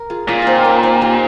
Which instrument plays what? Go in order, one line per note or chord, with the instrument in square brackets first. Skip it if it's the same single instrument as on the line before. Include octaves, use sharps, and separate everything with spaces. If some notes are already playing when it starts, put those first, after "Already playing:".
Already playing: [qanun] A#4
F4 G#4
[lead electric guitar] A#2 [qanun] C#4 F4
[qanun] C4 D#4 F4
A#3 C#4
C4 D#4
D#4 G4